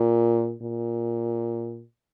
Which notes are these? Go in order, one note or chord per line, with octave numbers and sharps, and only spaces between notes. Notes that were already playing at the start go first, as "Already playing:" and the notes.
Already playing: A#2
A#2